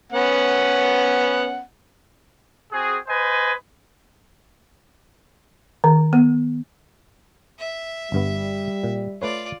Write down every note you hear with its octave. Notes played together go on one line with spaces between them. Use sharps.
B3 C#4 F#5
C4 F#4 G#4
B4 C5 D#5 G#5
D#3
B3
E5
G1 G2 G3 B3
A#2
A3 F4 B4 C#5 D5